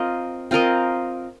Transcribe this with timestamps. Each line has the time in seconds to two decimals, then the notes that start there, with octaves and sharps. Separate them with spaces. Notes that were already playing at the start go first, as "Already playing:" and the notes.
Already playing: C4 F4 A#4 D#5
0.51 C4 F4 A#4 D#5